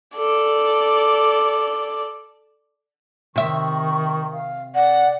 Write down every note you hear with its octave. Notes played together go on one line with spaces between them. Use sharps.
A4 D5
C3 D#3 E5 C#6
F5
D5 F#5